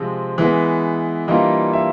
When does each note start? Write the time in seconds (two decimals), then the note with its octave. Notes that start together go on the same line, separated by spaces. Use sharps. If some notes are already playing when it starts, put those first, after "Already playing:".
Already playing: C3 F3 G#3 C4
0.38 E3 G#3 B3
1.28 E3 G3 A#3 D4 F4 D#5
1.73 E5